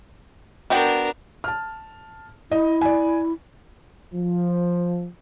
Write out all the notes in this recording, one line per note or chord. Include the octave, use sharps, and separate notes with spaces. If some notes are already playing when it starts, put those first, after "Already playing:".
B3 D4 F#4 A#4 G5
A5 F6
E4 D#5
D5 G#5
F3